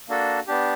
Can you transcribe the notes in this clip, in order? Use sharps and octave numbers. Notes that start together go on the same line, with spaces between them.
A#3 D4 F#4 A4
B3 D4 G4